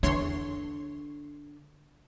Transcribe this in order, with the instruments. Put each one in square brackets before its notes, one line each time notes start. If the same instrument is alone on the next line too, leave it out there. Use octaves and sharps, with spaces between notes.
[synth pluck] E2 C#5 C6 [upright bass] D3 D4